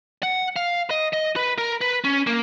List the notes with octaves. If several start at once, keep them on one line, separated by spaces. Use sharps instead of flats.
F#5
F5
D#5
D#5
B4
A#4
B4
C#4
A#3